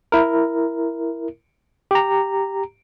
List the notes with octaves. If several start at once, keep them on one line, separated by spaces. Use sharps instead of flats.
E4 A#4
G4 A#5